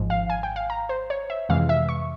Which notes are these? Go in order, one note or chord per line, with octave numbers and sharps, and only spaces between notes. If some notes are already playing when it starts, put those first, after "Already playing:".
Already playing: G#1 G#2 F3
F5
G#5
G5
F5
A#5
C5
C#5
E5
F2 C3 E3 G#3 F5
E5
C#6